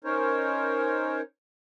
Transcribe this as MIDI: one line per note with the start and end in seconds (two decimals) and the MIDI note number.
0.04 1.21 61
0.04 1.21 63
0.04 1.21 70
0.04 1.21 72
0.04 1.21 73